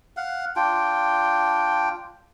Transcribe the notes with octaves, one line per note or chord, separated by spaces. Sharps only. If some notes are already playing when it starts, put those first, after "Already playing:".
F5 F#5
D4 F4 G5